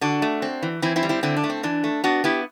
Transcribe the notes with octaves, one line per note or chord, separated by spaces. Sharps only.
D3 D4 F#4
A3
C4
E3
E3 C4 E4
C4 E4
G3
C4 E4
D3 C4 E4
D4
A3
C4
E3 D4
A3
B3 D4 F#4
B3 E4 G4